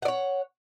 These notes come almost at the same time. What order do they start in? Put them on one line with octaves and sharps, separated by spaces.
F#5 D5 C#5